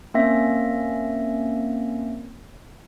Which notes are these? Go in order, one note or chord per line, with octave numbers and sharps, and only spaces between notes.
A#3 C4 C#4 E5 A#6